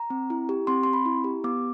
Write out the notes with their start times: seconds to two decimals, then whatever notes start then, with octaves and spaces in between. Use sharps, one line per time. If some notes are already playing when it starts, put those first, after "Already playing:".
Already playing: A#5
0.10 C4
0.30 E4
0.49 G4
0.67 C4 C6
0.83 C4 C6
0.93 B5
1.05 E4
1.24 G4
1.44 B3 D6